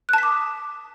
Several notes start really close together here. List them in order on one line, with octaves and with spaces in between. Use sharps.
F#6 A5 B6 D6 D#6